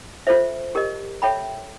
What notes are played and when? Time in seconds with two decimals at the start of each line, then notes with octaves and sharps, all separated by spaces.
0.27 F4 A4 C5 E5
0.75 G4 A#4 D#5
1.22 A4 C#5 E5 G5 B5